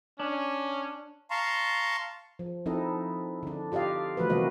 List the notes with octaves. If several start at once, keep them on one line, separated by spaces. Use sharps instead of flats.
C#4 D4
F5 A5 A#5 C6 C#6
F3
F3 C4 D#4 E4 A4 D#5
D3 D4
F4 G4 D5 D#5 F5
D3 E3 F3 A3 F#4 B4
C3 E3 G3 A#3 F#4 D#5